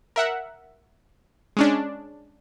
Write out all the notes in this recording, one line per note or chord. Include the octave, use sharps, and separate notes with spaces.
A#4 E5 F#5
G#3 C#4 D4